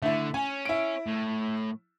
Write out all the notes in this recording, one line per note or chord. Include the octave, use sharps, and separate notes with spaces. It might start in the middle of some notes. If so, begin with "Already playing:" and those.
D3 A3 E4
C#4 G#5
E4 D7
A2